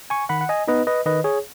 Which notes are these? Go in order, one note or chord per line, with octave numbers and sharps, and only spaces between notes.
G#5 C#6
D#3 F#5 B5
F#5
D#5 G#5
B3 D#4 B4 D#5
B4 D#5
D#3 B4 D#5
G#4 C#5